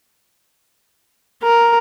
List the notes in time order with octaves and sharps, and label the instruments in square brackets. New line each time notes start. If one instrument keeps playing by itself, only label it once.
[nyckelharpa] A#4